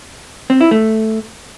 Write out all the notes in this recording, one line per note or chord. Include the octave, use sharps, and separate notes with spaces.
C4
E4
A3